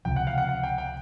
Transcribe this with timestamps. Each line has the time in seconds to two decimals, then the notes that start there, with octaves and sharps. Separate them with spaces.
0.05 C#2 C3 F3 G5
0.16 F#5
0.27 F5
0.38 F#5
0.49 F#5
0.63 G5
0.78 G5